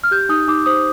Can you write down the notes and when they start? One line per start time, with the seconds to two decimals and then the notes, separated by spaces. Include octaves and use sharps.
0.04 F6
0.11 G4 G6
0.29 D#4 D#6
0.48 D#4 D6
0.66 C5 D#6